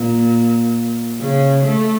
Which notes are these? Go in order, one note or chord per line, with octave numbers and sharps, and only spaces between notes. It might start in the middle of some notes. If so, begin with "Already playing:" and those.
Already playing: A#2
C#3
A3